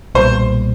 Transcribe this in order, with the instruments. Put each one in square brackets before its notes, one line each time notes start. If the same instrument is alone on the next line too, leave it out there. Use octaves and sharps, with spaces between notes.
[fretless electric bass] B1 A#2 G3 [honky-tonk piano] C5